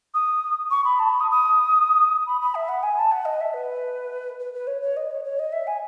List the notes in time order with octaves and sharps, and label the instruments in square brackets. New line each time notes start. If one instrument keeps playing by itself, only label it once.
[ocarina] D#6
C#6
B5
A5
B5
D#6
D#6
B5
B5
E5
F#5
G#5
A5
F#5
D#5
E5
B4
B4
B4
C#5
C#5
D#5
C#5
C#5
D#5
E5
G#5